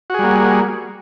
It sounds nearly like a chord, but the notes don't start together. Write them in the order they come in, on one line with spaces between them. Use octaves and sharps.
F#4 G#4 G3 A#3